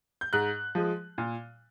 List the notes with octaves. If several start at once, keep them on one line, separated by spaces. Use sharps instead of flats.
G6
G#2 F#6
F3 G#3
A#2